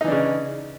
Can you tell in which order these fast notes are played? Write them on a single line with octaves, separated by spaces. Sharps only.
D#4 E3 D4 C#3